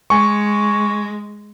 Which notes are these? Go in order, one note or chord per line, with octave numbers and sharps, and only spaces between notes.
G#3 G#5 C#6